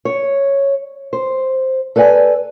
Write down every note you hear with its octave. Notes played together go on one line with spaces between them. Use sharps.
C#5
C5
A4 B4 D5 F#5 G#5